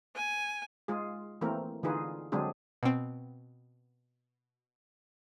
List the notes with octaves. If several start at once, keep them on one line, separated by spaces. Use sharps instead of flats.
G#5
G#3 F4 G#4
E3 A3 A#3 C4 A#4
D3 E3 D#4 F4 G#4 B4
D3 F#3 G#3 C4 D4 G#4
B2 C4